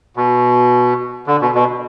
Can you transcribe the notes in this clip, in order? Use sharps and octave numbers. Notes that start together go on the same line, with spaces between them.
B2
D3
B2
B2